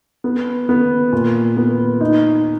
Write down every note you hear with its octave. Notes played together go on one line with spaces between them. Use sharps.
B3
B3
A#2
B3
D#4